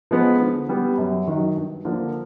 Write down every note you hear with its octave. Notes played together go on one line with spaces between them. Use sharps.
F3 G#3 B3
D3
G3 B3
F#2
D#3 F#3
G2
D3 F3 A#3 D4